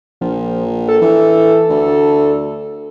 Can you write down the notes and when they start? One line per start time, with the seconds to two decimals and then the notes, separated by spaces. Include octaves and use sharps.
0.21 A#1 F3
0.88 A4
1.02 E3
1.70 D2